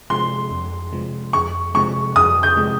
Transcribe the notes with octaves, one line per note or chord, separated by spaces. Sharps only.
C3 F3 G#3 C6
F2
C3 F3 G#3
F2 C#6
C3 F3 G#3 C#6
F2 D#6
G6
C3 F3 G#3